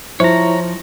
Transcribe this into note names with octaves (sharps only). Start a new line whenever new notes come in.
F3 E4 F4 C5 C#5 E5 A#5